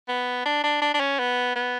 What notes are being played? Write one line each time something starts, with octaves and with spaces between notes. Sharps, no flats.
B3
D4
D4
D4
D4
C#4
B3
B3